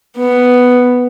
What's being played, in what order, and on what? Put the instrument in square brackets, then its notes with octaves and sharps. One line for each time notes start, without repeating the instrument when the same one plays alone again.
[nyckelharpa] B3